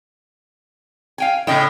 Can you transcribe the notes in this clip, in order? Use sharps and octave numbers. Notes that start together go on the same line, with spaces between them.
F5 G5 G#5
A2 C#3 D#5 G5